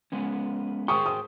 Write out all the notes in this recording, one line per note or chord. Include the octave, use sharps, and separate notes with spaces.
G#3 B3 C#4
G#4 C5 G5 C#6 D#6
D#6